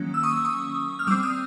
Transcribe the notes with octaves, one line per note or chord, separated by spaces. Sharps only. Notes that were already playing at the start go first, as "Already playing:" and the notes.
Already playing: D#3 F#3 A#3 C#4
E6
C#6 D#6
C#6 D#6
F6
G3 C4 D6 E6
D#6 F6